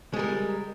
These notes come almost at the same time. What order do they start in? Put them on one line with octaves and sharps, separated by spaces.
G#3 G3 A#4